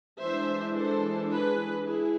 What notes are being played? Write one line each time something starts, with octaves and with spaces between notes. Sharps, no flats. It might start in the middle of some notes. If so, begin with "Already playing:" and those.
E3 G#3 D4 C5 E5
A4 C5
G#4 B4
E4 G#4